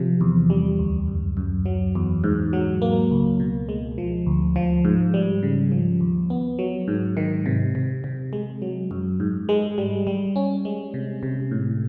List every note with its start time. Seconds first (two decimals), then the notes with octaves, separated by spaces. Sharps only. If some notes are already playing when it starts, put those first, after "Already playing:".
Already playing: C3 F3
0.21 E2
0.50 G3
0.79 D2
1.08 F#2
1.37 F#2
1.66 F#3
1.95 E2
2.24 G#2
2.53 F#3
2.82 A#3
3.11 C#2
3.40 B2
3.69 G#3
3.98 F3
4.26 D2
4.56 F3
4.85 G#2
5.14 G3
5.43 C#3
5.72 F3
6.01 D#2
6.30 B3
6.59 F#3
6.88 G#2
7.17 D#3
7.46 C3
7.75 C3
8.04 C3
8.33 G#3
8.62 F#3
8.91 F#2
9.20 G#2
9.49 G#3
9.78 G3
10.07 G3
10.36 C#4
10.65 G#3
10.94 C3
11.23 C3
11.51 A2